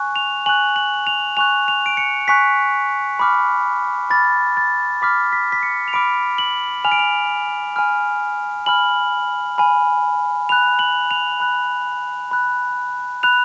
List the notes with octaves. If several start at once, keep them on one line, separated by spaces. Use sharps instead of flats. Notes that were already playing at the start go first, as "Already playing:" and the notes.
Already playing: G#5 C#6 F#6
F7
G#5 C#6 F#6 F#7
F#7
F7
G#5 C#6 F#6 F7
F7
D7
C#7
G#5 C#6 F#6 B6
B5 D6 F6
B5 D6 F6 A6
A6
B5 D6 F6 B6
B6
B6
C#7
F7
B5 D6 F6 D7
F#7
G#5 B5 F6 F7
D7
F7
G#5 B5 F6
G#5 B5 F6 F#7
G#5 B5 F6
B5 F#6 F7
F#7
F7
B5 F#6
B5 F#6
B5 F#6 F7